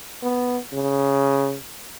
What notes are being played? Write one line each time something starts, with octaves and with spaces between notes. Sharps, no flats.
B3
C#3